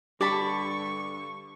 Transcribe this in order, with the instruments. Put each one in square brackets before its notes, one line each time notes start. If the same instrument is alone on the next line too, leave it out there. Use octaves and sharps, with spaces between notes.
[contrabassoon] G2 [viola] D3 C#6 [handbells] G4 [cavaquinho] D5 A5 B5